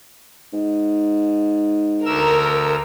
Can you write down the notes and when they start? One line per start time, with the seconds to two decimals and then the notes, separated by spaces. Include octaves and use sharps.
0.53 G#2
2.06 D2 A#4 E6